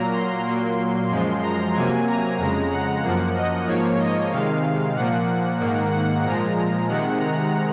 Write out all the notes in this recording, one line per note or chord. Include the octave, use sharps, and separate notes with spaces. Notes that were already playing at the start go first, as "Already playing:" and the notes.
Already playing: A#2 F#3 A#3 A#5
C6
A#2 F#3 A#3
F#2 F3 G#3 C6
A#5
C3 F#3 A#3 G#5
A#5
F2 C#3 G#3 A#5
F#5
F#2 F3 A#3 F#5
D#5
G#2 F3 A#3 C#5
D#5
C3 D#3 G#3 F5
A#2 F3 A#3 F#5
G#2 D#3 A#3
F#5
A#2 F3 G#3 A#5
C3 D#3 G#3 F#5
A#5